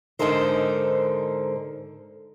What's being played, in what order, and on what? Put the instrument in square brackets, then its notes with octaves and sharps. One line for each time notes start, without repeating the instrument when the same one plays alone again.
[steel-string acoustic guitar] G#2 D3 D#4 A4 A#4 C5